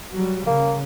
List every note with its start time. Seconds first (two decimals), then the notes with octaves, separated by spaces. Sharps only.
0.13 F#3 G3
0.46 C#3 A#3